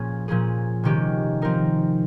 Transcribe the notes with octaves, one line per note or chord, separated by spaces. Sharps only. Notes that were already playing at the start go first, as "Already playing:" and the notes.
Already playing: A#2 F3 A#3 C#4 G#4
A#2 F3 A#3 C#4 G#4
C3 D#3 G#3 C#4 G4
F3 C4 D#4 A#4